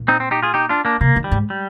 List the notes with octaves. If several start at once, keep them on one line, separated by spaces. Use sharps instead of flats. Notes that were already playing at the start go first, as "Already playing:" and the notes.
Already playing: A#2
C4 D#4
C4
D#4 G4
F4 G#4
D#4 G4
D4 F4
A#3 D4
C3 A#3
D#3
G3
G#2
G3